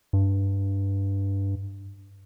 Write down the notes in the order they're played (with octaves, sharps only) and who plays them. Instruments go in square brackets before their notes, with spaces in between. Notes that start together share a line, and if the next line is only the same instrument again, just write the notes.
[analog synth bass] G2